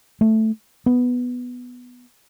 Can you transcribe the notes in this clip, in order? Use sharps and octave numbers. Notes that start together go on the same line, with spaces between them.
A3
B3